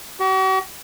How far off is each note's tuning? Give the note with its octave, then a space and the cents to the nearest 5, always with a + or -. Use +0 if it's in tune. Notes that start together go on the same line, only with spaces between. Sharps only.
F#4 +45